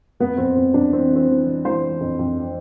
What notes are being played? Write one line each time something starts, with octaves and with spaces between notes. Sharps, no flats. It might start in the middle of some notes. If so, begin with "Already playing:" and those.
F2 B3
F2 C4
F2 C4
F2 D4
E3 C4
E3
C4
E3
E3
E3 C5
E3
F2
F2